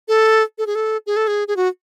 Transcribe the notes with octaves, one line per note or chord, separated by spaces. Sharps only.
A4
A4
G#4
A4
G#4
A4
G#4
G#4
F#4